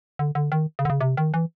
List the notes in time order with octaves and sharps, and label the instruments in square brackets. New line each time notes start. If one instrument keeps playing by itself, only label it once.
[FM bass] D3
D3
D#3
C#3
D3
C#3
C3
D#3
E3